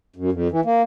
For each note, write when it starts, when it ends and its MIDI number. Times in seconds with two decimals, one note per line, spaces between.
0.16 0.30 42
0.32 0.48 41
0.51 0.60 52
0.65 0.82 58